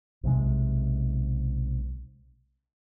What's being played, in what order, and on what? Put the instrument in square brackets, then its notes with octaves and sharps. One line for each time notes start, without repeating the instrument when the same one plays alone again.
[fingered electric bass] B1 C3 F#3 G#3